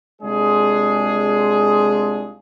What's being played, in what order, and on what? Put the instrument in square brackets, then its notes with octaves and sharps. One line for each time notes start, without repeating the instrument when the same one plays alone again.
[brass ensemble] C2 G#3 D4 F4 G#4